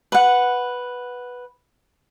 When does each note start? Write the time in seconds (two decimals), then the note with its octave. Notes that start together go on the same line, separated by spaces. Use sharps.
0.12 B4 F#5